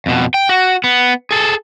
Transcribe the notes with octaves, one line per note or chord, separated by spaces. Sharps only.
F2 B2
G5
F#4
B3
G#4 A4